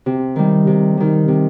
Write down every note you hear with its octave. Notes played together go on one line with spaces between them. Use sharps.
C3
D#3 G3
C3
D#3 G3
C3